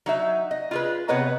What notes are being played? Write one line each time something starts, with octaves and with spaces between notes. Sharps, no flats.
F#3 D#4 E5
D#5
F4 G#4 B4
C3 B3 B4 C#5 D#5 A#5